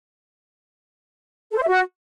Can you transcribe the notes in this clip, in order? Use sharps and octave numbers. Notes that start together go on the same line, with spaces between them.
A4
C5
E5
F#4